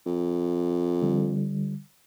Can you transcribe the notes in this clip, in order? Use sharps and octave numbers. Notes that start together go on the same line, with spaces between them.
F2
D3 G3